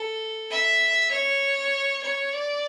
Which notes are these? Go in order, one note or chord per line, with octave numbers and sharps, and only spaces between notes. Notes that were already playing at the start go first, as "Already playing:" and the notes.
Already playing: A4
E5
C#5
C#5
D5